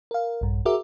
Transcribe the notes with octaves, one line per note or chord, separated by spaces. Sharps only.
A#4 F5
A#1 G2
F#4 G#4 A#4 E5 D6